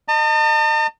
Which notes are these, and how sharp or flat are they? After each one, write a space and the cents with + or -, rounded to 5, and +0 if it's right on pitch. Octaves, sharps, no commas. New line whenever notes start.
D#5 -25 A5 +45